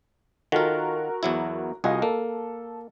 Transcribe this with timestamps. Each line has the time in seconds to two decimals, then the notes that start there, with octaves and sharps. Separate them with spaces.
0.52 D#3 F4 F#4 A4 A#4
1.23 E2 F#3 E4
1.84 C2 F4 F#4 G#4 D#5
2.02 A#3 A4